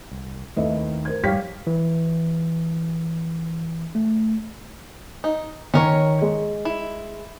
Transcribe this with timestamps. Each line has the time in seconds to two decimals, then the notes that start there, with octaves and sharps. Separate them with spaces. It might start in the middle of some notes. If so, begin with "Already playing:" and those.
0.12 C2
0.57 D#2 D#3 A3 C4 E4 B4 D#5 E5
1.05 A#4 C5 G#6
1.24 F2 G#2 G3 G4 C#5 F5 G5 B6
1.67 E3
3.95 A3
5.24 D#4
5.74 D#3 C#4 A#4 C#5
6.22 G#3
6.65 E4